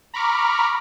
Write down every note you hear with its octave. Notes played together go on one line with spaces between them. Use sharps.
A#5 B5 C#6 D6 F6